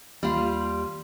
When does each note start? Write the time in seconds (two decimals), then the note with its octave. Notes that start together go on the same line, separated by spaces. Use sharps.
0.23 D#2 G3 F4